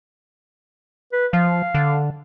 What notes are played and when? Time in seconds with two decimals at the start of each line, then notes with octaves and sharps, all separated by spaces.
1.13 B4
1.33 F3 F5
1.74 D3